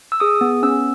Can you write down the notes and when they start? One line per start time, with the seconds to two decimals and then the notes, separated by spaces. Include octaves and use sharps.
0.12 E6
0.20 G#4 D#6
0.41 B3
0.63 C#4 E6